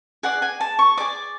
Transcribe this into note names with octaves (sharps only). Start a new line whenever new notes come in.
G#4 D5 F#5
G#5
A5
C#6
G#4 D5 D6